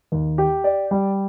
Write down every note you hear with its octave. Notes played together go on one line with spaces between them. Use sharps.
D#2
G4
D5
G3